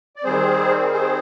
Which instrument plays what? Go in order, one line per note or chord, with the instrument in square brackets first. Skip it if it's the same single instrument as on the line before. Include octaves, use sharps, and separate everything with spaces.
[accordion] D5
D#3 G3 C4 G#4 C5
G#4 C5